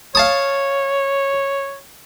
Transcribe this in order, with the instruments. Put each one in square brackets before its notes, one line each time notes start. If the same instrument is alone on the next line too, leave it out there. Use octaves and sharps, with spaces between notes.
[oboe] C#5 [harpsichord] F5 A5 D#6